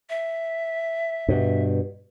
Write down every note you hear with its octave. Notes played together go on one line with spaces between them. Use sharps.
E5
G2 B2